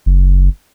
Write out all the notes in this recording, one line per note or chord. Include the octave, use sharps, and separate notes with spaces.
F#1